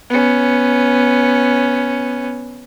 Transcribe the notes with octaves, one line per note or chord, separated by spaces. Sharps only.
B3 C#4